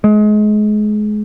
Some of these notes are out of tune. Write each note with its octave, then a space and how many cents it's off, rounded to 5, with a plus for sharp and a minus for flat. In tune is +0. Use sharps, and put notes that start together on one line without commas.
G#3 +30